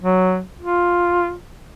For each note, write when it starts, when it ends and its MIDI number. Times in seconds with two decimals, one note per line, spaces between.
0.02 0.41 54
0.61 1.33 65